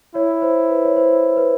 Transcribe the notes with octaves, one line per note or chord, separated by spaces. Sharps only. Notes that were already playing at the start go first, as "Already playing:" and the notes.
E4 C#5
C5
B4
C#5
C5
B4